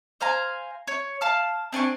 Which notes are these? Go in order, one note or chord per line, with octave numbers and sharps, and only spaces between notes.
C5 F5 G#5 A#5
C#5
F5 A5 F6
C4 D4 G#5 C#6